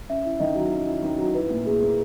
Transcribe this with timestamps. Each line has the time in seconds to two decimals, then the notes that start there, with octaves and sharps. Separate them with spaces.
0.10 C#4 E5
0.25 E4
0.40 D#3 D#5
0.56 F#3
0.71 C#4
0.88 E4
1.03 D#3
1.18 F#3
1.35 E4 B4
1.50 A#2
1.66 A#2 G#4
1.82 A#3